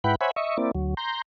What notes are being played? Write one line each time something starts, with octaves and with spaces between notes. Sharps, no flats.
G#2 E4 B4 F#5 G5 B5
C5 C#5 E5 F#5 G#5 B5
D#5 E5 C#6
A#3 C4 E4 D5
D2 F#3
A#5 C6 G6